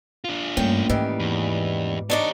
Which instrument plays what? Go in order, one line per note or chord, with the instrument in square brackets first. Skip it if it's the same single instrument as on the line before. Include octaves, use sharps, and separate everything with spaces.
[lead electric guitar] D4 F4
[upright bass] G2 [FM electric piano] A3 A#3 C#4 [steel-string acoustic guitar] G5
[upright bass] G#2 [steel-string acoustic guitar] D#3 E3 G3
[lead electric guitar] E2
[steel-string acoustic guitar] D4 D#4 D5 [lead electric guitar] G4 C#5